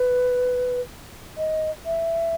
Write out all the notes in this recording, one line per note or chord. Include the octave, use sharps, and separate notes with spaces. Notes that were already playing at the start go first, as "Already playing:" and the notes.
Already playing: B4
D#5
E5